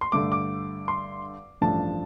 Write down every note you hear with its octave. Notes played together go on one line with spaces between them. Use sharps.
C6
G2 D3 A3 D6
D6
C6
A1 G2 F3 A3 D4 A5